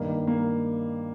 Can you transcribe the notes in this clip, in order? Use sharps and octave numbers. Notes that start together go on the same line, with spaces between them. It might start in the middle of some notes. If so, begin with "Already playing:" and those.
Already playing: G2 D#3 A#3
A#3